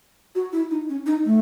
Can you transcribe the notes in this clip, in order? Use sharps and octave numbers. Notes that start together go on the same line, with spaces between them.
F#4
E4
D#4
C#4
D#4
A3